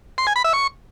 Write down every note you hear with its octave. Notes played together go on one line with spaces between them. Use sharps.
C6
G#5
B5
E5
C#6